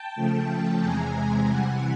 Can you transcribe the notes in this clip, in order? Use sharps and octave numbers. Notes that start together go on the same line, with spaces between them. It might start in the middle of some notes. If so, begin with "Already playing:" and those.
Already playing: G5 A5
C#3 F3 A3
E2 C3 E3 G#3 G#5 A#5
C3 E3 G3 F#5 G#5